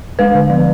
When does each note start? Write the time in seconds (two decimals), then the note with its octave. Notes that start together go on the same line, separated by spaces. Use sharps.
0.19 G#3 B4
0.35 D3
0.50 F3